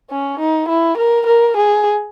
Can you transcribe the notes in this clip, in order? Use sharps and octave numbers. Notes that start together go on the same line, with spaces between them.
C#4
D#4
E4
A#4
A#4
G#4